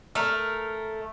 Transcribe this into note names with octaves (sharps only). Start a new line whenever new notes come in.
A3 A#4